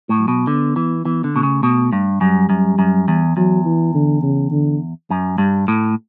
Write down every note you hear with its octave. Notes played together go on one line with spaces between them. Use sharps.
A2
F#3
B2
D3 B3
E3
E3 B3
D3
B2 A3
C#3
B2
G2
F#2 G3
F#2
F#2
E2
E2 F#3
E3
D3
C#3
D3
F#2 F#3
G2 G3
A2 A3